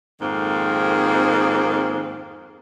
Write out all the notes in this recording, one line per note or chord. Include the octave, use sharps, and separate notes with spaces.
F2 G#2 D#3 A#3 C4